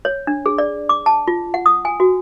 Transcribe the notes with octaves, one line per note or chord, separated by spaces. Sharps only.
C#5
D4
G#4
D5
D6
A5
F4
F#5
D#6
G#5
F#4